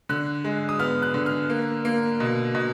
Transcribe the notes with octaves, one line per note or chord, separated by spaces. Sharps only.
D3 F#6
G#3
D#6
B3 F6
F#6
D3
F6
A#3
A#3
B2
B2